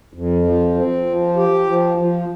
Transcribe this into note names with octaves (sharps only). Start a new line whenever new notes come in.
F2
F3
C4
F3
G4
F3
F3